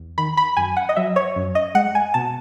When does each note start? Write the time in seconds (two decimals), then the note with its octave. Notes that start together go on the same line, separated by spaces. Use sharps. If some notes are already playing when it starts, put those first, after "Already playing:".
Already playing: E2
0.18 D#3 B5
0.37 B5
0.57 F#2 G#5
0.77 F#5
0.89 D#5
0.96 F#3 E5
1.16 C#5
1.36 F#2
1.55 D#5
1.75 G#3 F#5
1.95 G#5
2.14 B2 A5